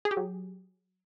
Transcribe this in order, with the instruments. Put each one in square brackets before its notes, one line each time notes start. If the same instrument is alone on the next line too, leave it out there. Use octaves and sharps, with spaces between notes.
[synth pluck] G#4
G4
F#3